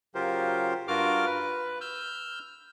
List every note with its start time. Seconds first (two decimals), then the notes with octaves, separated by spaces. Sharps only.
0.15 C#3 F#3 F4 G4 A#4 C5
0.88 G2 F4 F#4 A#4 D6 F6
1.26 B4
1.81 E6 F6 G6